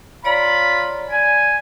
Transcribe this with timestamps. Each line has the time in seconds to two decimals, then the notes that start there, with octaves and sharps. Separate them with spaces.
0.24 F4 C#5 D5 A#5 B5
1.10 D5 G#5